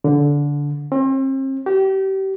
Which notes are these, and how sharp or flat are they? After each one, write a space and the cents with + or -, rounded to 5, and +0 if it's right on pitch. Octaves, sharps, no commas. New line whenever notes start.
D3 -15
C4 +40
G4 -30